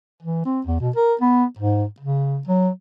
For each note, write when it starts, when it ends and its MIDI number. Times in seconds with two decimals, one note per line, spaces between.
0.23 0.44 52
0.45 0.61 60
0.66 0.78 40
0.80 0.90 47
0.96 1.14 70
1.21 1.44 59
1.59 1.84 44
2.00 2.40 49
2.47 2.69 54